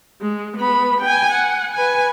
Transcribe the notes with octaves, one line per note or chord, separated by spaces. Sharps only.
G#3
B3 B5
G5 G#5
F#5
B4 G#5